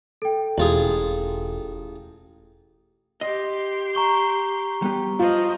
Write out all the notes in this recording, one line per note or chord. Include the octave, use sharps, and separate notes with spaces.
A4 G5
E1 A1 F4 G#4
G4 D#5 C6
A#5 C#6 G7
G3 B3 G4
F3 F4 D#5